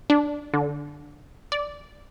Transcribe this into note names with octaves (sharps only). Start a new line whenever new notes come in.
D4
D3
D5